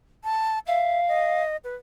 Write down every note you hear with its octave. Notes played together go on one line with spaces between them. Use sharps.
A5
E5 F5
D#5
B4